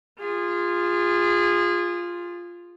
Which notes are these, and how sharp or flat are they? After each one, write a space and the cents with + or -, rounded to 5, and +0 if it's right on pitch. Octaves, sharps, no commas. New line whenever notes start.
F4 +0 G#4 -25